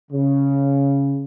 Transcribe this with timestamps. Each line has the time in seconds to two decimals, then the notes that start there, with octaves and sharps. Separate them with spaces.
0.11 C#3